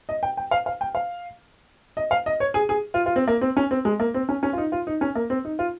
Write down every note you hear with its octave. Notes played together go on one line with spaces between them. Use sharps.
D#5
G5
G5
F5
F5
G5
F5
D#5
F5
D#5
C#5
G#4
G#4
F4
F4
C4
A#3
C4
C#4
C4
G#3
A#3
C4
C#4
C#4
F4
D#4
F4
D#4
C#4
A#3
C4
D#4
F4